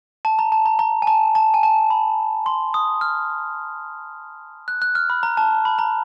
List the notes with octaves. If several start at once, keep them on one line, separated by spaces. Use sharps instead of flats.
A5
A#5
A5
A#5
A#5
G#5
A5
A5
G#5
A5
B5
C6
D#6
F6
F#6
F#6
F6
B5
A#5
A5
B5
A#5